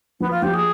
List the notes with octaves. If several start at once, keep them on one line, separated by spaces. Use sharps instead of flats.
F3 B3
F4
F3 G4
G#4